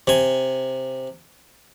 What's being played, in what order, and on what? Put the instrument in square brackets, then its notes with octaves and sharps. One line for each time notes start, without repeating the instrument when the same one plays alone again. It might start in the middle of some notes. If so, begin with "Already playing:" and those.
[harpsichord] C3 G#5